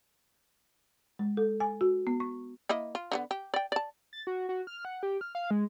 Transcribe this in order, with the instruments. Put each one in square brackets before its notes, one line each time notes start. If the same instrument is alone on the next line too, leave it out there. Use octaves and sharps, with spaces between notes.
[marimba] G#3
A4
G#5
F#4
B3
C#6
[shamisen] A#3 E4 D#5
F4
D3 A3 B3
G4
D5 G5
D5 A5
[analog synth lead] A6
F#4
F#4
F6
F#5
G4
F6
F5
G#3